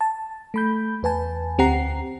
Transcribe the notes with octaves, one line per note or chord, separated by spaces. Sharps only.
A5
A3 B5 G6
E2 B4 G#5 A5
D2 C4 G4 F#5 A#5 C7